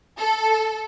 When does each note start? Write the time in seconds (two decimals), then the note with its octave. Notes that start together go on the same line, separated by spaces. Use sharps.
0.19 A4